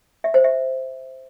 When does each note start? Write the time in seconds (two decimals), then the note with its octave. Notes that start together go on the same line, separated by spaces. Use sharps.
0.24 E5
0.34 C5
0.44 E5